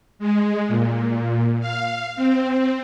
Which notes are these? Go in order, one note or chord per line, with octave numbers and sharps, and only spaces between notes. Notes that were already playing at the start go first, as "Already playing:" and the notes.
G#3
A#2
F5
C4